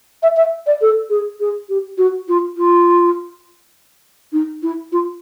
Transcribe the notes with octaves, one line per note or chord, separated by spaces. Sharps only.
E5
E5
D5
A4
G#4
G#4
G4
F#4
F4
F4
D#4
E4
F4